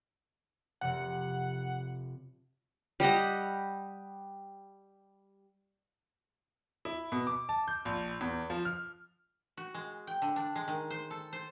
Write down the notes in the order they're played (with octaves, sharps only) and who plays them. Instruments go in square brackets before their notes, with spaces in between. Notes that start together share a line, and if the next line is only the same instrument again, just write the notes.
[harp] F1 C3 A#4 [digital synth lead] F#5
[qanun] G3 G4 D#5 F#5
[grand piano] E4
B2
D6
A5
G6
A#1
E2
F3
F6
[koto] F#4
G#3
G5
D3
D4
G#3
D#3
C5
A4
C5